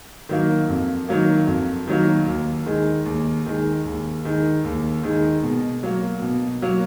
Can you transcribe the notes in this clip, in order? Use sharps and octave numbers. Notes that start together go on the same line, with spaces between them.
D#3 F#3 A#3
F2
D#3 F#3 A#3
F2
D#3 F#3 A#3
D#2
D#3 G#3
D#2
D#3 G#3
D#2
D#3 G#3
D#2
D#3 G#3
B2
F#3 A#3
B2
F#3 A#3